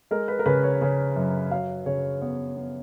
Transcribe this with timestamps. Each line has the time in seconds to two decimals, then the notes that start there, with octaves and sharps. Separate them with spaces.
0.11 G#3 A#4
0.28 B4
0.39 A#4
0.46 C#3 B4
0.63 C#5
0.81 C#3
1.16 F#2
1.51 F#3 F5
1.86 C#3 C#5
2.21 B3 C#5
2.57 B3